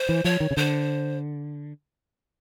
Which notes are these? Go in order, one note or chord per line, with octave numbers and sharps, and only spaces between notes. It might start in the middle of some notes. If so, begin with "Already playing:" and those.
Already playing: C5
E3
F3 C#5
D#3
C#3
D3 C5